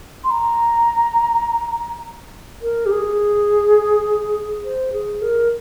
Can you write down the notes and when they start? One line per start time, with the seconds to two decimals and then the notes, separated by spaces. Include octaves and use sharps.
0.24 C6
0.30 A#5
2.62 A#4
2.86 G4
2.91 G#4
4.64 C5
4.92 G#4
5.21 A#4